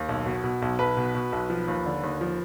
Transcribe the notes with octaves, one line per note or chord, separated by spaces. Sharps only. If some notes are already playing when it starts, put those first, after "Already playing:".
Already playing: D#2
B1
B2
B2
B1
B1 B4
B2
B2
B1
F3
D#2
D3
D#2
F3